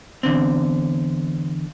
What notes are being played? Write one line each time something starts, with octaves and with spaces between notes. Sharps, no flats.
E2 D3 C4